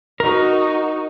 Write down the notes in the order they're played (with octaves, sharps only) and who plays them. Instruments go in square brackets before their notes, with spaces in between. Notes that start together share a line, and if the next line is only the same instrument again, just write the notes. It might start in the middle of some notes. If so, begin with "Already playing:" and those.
[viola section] D#4 F#4 [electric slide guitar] A#4